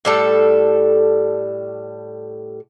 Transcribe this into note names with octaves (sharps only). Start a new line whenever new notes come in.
A2 G3 A4